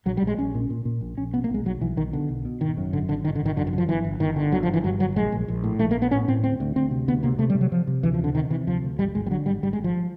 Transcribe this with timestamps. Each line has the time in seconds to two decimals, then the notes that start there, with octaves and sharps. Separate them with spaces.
0.06 A#1 F#3
0.17 G3
0.22 A#1
0.27 G#3
0.38 A#1 C#4
0.54 A#2
0.70 A#2
0.85 A#2
1.01 A#1
1.18 A#1 C#4
1.34 B2 B3
1.44 A#3
1.50 B1 G#3
1.65 B1 F#3
1.81 B1 E3
1.97 B1 D#3
2.13 B2 D3
2.29 B1
2.45 B2
2.61 G#1 D#3
2.77 F#2
2.93 G#1 D3
3.08 G#1 D3
3.25 G#1 D#3
3.36 D3
3.41 G#1 D#3
3.56 F#2 D3
3.67 D#3
3.73 D3
3.78 F3
3.89 G1 E3
4.05 G1
4.20 G1 D#3
4.36 D3
4.52 G1 F#3
4.63 F3
4.68 G1
4.73 E3
4.84 G2 F#3
5.00 G1 F#3
5.16 A#1 G#3
5.32 A#1
5.48 A#1
5.64 A2
5.79 A#1 A3
5.91 A#3
5.95 A#1
6.02 B3
6.11 A2 C#4
6.28 A2 C4
6.43 D2 C4
6.60 D2
6.76 D2 C4
6.91 C3
7.08 D2 B3
7.23 C3 A#3
7.39 C3 A3
7.50 G3
7.55 C3
7.61 F#3
7.72 C3 F3
7.87 C3
8.03 D2 E3
8.14 F3
8.19 C3
8.24 D3
8.35 C3 D#3
8.50 C3 E3
8.67 D2 F3
8.82 D2
8.99 G#1 G3
9.14 G#1 G#3
9.27 G3
9.31 D3 F#3
9.46 G#1 G3
9.63 G#1 G3
9.73 G#3
9.78 G#1
9.84 F3